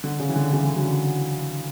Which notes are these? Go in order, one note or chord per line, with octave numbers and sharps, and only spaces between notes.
D3
C#3
E3
D3
C#3 E3
D3
D3 F#3